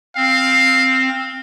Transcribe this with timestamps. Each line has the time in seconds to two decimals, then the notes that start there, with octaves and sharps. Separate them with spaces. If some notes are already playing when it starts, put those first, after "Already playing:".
0.16 C4 F5